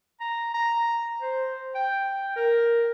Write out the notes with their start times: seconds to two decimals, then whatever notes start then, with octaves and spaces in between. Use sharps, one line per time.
0.21 A#5
0.54 A#5
1.22 C5
1.75 G5
2.36 A#4